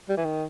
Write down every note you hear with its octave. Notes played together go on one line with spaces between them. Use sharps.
G3
E3
D#3